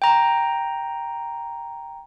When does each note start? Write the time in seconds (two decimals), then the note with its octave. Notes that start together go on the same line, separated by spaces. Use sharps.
0.02 G5 A#5